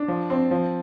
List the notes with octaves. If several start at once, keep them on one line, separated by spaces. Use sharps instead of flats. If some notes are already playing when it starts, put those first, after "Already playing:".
Already playing: D4
F3
C4
F3